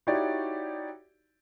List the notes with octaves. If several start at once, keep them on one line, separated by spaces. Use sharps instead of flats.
D#4 E4 F#4 G4 C#5 D5